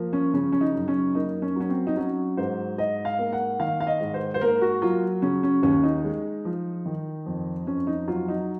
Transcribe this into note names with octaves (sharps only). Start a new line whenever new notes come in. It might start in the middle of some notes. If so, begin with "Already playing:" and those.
Already playing: F3 A#3
C#4
C#3 C#4
C#4
D#4
F#2
C#4
A#3 D#4
C#4
F#3 C#4
C4
D#4
F#3 C#4
G#2 C5
G#2 D#5
F5
A#3
F#5
D#3 F5
F5
D#5
G#2
C5
C5
A#3 A#4
F#4
F#3 F4
C#3 C#4
C#4
D#2 C#4
D#4
G#3
F3
D#3
F2
F2 C#4
D#4
F#3 F4
D#4